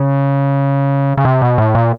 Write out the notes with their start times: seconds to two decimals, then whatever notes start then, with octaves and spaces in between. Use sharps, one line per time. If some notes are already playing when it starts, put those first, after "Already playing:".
Already playing: C#3
1.17 C#3
1.25 C3
1.42 B2
1.58 A2
1.75 A#2